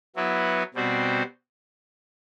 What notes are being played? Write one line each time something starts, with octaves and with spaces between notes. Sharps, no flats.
F#3 B3 E4 B4
B2 G3 C4 F#4 C5